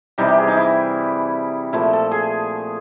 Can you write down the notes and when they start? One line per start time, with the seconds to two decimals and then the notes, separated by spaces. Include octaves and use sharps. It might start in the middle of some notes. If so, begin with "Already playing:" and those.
0.18 C3 E3 G3 D#4
0.29 G4
0.38 G#4
0.48 D#4
0.57 E4
1.73 A#2 F3 A3 E4
1.93 A4
2.11 G#4